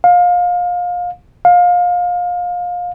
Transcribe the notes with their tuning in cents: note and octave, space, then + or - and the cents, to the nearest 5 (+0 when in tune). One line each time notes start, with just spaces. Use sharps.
F5 +25
F5 +25